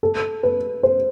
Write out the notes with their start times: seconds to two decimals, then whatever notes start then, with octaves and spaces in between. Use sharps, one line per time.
0.03 A4
0.43 B4
0.83 C5